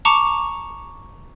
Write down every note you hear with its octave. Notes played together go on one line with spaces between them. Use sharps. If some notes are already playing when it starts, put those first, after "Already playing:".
A5 A#5 C#6 D6 C#7